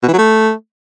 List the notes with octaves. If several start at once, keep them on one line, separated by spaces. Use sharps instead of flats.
B2
E3
F#3
A3